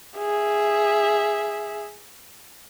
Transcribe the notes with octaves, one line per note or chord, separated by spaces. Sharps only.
G#4 E5